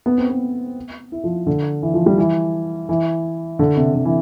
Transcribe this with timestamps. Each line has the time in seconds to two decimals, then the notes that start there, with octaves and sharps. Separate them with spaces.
0.06 B3
0.18 C4
0.29 B3
1.12 E4
1.24 F3
1.46 D3
1.82 E3
1.94 F3
2.06 G3
2.18 E3
2.89 E3
3.59 D3
3.77 C3
3.94 D3
4.05 E3